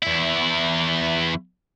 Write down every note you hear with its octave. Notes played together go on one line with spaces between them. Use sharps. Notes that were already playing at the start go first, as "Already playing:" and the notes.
E2 E4